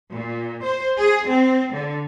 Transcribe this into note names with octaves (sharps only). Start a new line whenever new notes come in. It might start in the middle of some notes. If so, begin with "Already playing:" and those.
A#2
C5
G#4
C4
D3